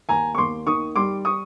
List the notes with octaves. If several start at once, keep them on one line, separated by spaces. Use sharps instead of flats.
D#2 G#5 A#5
C#6
D#2 C6 D6
D#3 C#6 D#6
G3 C6 D6
C#6 D#6